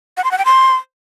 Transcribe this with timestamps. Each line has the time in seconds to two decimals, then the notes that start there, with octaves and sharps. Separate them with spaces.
0.17 F#5
0.24 C6
0.31 F#5
0.38 G5
0.45 C6